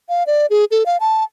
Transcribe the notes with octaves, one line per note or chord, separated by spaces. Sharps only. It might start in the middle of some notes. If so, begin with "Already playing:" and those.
F5
D5
G#4
A4
F5
A5